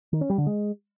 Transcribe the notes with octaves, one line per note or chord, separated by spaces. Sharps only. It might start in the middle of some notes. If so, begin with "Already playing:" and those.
D#3
C#4
G3
D3
G#3